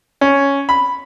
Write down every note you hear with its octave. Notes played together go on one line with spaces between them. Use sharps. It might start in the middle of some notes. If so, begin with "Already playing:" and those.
C#4
B5